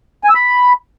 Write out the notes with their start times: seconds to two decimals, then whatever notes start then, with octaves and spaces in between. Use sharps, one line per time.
0.24 G#5
0.29 E6
0.35 B5